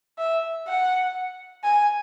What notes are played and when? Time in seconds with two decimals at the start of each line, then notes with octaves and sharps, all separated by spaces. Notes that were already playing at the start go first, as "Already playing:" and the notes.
0.18 E5
0.67 F#5
1.64 G#5